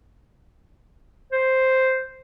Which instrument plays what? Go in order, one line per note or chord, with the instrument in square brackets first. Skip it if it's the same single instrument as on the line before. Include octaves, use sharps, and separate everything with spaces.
[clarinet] C5